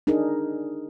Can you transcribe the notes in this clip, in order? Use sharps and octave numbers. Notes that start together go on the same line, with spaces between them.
D4 D#4 G#4 A#4